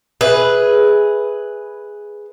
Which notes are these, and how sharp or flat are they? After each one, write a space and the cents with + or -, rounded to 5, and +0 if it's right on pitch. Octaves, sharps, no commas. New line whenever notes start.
G#4 +0 B4 +0 E5 -15